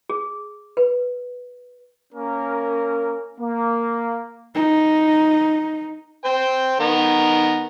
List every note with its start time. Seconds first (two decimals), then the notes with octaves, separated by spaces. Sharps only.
0.10 G#4
0.77 B4
2.13 A#3 C#4 A#4
3.40 A#3
4.55 D#4
6.25 C5 G5
6.80 D#3 B3 A#5